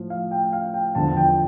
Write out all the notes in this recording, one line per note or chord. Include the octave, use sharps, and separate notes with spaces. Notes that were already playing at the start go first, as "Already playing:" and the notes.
Already playing: A2 F3
F5
G5
F5
G5
E2 D3 F3 A5
G5